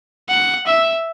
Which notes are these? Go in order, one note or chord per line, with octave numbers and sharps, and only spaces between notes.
F#5
E5